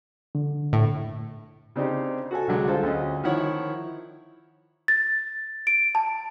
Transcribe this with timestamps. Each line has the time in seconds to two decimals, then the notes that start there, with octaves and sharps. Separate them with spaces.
0.35 D3
0.73 A2
1.76 C#3 C4 D4 D#4 G4
2.31 F#4 A4 G#5
2.47 C2 D3 F#3 G#3
2.67 F4 A4 C5 A5
2.83 D2 C#4 D#5
3.24 D#3 F3 E4 C#5 F#5
4.88 A6
5.67 D7
5.95 A5